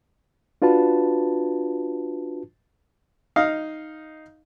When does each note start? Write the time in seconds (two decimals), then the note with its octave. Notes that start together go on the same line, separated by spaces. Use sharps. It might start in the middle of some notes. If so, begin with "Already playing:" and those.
0.62 D4 F4 F#4 B4 A5
3.36 D#4 D#5 F5